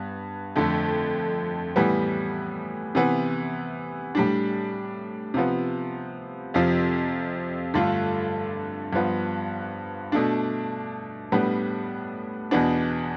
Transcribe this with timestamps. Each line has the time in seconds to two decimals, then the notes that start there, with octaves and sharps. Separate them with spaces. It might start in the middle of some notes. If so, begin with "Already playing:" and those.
Already playing: G2 B3
0.56 F2 D3 A3
1.76 A2 E3 G3 B3
2.95 C3 E3 B3
4.15 A2 G3 D4
5.34 C3 F3 B3
6.54 F2 C3 F3
7.74 G2 D3 A3 D4 F4
8.93 G2 F3 B3
10.12 B2 A3 D4
11.32 A2 G3 B3 D4
12.51 E2 B2 B3 D4